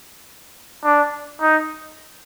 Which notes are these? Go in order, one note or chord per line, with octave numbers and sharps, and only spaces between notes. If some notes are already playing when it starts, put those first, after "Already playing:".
D4
D#4